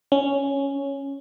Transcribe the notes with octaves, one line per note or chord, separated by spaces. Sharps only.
C#4